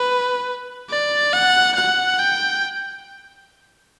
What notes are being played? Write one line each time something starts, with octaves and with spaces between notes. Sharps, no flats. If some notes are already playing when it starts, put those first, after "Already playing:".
Already playing: B4
D5
F#5
F#5
G5